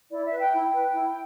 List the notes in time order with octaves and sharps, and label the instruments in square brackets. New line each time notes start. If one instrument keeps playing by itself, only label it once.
[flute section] E4 D5
E5
B4
G5
E4 G5
B4
E4